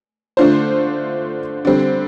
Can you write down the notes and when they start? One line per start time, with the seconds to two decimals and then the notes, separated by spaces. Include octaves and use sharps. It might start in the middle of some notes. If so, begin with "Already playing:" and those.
0.37 D3 A3 D4 F4 C5
1.65 D3 G3 C4